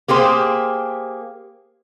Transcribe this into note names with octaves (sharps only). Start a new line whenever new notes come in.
A#3 G4 G#4 C5